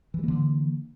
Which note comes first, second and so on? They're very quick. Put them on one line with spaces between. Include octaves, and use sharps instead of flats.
E3 G3 A#3 D3